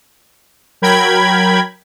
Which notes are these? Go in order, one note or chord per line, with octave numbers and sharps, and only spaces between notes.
F#3 A#4 G5 B5 G#6